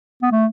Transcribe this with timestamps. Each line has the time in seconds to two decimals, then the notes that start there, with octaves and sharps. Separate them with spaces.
0.22 B3
0.32 A3